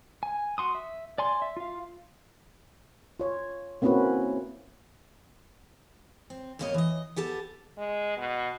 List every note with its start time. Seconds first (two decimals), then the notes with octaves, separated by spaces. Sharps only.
0.23 G#5
0.58 F#4 C6 D#6
0.75 E5
1.18 D5 G#5 C6
1.42 E5
1.57 F4 F5
3.20 F4 C#5
3.82 A#3 C4 C#4 E4 F#4 B4
6.30 C4
6.59 F2 A2 A#3 A#4 C#5 D#5
6.74 E3 D#5
7.16 B3 G4 A4 A5
7.78 G#3
8.17 B2